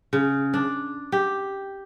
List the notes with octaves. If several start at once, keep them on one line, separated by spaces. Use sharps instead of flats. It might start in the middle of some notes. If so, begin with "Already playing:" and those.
C#3
D4
G4